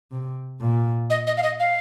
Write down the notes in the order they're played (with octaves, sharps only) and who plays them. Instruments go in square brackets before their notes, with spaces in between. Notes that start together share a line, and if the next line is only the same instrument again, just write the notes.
[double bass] C3
A#2
[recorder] D#5
D#5
F5
D#5
F5